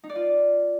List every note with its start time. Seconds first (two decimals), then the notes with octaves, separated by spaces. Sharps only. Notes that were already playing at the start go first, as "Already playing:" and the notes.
0.04 D#4
0.09 D5
0.15 F4